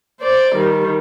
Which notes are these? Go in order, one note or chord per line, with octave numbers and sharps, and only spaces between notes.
C5 D5
D#3 G3